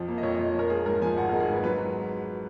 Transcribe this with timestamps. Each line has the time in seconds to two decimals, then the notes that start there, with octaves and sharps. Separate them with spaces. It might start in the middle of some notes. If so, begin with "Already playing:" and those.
Already playing: F2 F3
0.08 A#3
0.18 D#5
0.23 F2 C#5
0.35 D#5
0.39 F2
0.54 F3 A#4
0.70 G#3 G#4
0.86 G#2 A#4
1.02 F3 G#5
1.17 G#1 F#5
1.29 A#4
1.33 G#3
1.40 G#4
1.48 G#2 B4
1.63 F#3 B4